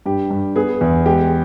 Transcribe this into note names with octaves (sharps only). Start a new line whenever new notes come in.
G2 G4
G2
B3 G#4
E2
G#3 G4